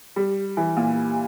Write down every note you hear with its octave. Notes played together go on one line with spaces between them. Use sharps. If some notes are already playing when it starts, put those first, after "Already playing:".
G3
E3
A#2